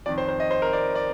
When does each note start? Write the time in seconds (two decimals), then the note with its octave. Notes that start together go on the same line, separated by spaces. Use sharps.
0.06 F2 D#3 D5
0.18 C5
0.28 C5
0.40 D#5
0.51 C5
0.62 A#4
0.73 D5
0.95 D5